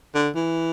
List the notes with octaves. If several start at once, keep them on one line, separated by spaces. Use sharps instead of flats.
D3
E3